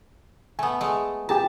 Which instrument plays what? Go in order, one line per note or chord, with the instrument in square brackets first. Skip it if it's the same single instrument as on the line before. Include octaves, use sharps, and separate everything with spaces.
[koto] A3 B3 [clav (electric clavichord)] G#5
[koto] G#3 A3
[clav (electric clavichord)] G4 G#4 A#5 [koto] A5